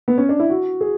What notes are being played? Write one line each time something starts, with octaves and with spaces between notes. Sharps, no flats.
B3
C#4
D4
E4
F#4
G#4